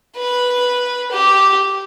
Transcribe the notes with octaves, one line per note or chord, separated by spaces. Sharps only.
B4
G4